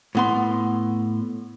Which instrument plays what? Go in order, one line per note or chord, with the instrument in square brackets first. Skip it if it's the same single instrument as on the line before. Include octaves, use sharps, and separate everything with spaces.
[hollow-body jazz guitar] A2 B3 C6